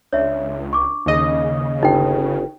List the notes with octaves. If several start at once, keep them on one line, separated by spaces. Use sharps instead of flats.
C#2 D4 C#5 E5
C#6 D6
D#2 C#3 D#5
G1 D#4 G5